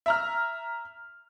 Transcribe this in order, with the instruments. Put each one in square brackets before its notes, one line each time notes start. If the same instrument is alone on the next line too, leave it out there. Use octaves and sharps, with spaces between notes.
[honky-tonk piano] E5 A#5 F6